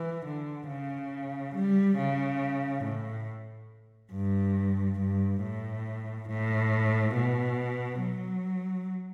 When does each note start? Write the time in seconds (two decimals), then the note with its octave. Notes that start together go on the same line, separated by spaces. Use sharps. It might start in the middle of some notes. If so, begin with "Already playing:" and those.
Already playing: E3
0.25 D3
0.68 C#3
1.55 G3
1.97 C#3
2.84 A2
4.13 G2
4.99 G2
5.42 A2
6.28 A2
7.14 B2
8.01 F#3